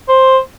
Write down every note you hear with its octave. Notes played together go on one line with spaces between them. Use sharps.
C5